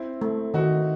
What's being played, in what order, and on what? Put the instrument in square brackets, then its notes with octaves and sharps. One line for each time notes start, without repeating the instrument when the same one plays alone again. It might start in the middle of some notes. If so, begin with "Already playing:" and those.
Already playing: [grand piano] C4 E4
[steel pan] A3
[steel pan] D#3 [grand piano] D#4 F#4